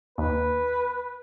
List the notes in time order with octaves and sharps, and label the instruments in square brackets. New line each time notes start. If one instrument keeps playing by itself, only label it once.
[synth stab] D#2 [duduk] B4